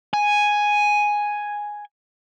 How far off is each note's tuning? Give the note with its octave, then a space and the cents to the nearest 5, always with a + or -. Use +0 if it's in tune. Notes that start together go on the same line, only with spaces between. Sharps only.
G#5 +0